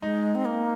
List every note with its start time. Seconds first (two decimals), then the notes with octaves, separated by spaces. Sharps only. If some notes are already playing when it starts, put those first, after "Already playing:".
0.02 G#3 D#4
0.35 C4
0.45 A#3